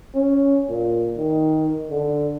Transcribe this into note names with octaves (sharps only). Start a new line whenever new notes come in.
C#4
A#2
D#3
D3